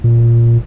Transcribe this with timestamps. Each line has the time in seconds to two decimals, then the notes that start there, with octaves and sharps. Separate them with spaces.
0.04 A#2